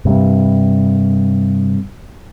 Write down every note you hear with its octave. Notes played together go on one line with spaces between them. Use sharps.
G2 C3